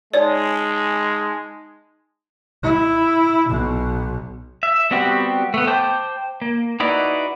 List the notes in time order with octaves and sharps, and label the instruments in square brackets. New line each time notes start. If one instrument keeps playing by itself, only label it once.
[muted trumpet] G#3 [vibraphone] D#4 G#5 A5 [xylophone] C#5 D5
[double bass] E4
B1 B2
[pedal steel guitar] E5
G3 B3 C4 F#4 G4
A3 B3
C5 G5 A5 D6 G6
A#3
D#4 E4 F#4 B4 D5